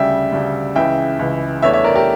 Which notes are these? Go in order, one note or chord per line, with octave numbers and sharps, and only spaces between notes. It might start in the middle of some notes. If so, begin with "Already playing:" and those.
Already playing: D2 C#3 G3 E5 G5
D2 C#3 G3
C#2 C#3 E3 E5 G5
C#2 C#3 E3
E2 E3 A3 D4 C#5 E5
C#5 E5
A#4 D5
G4 A#4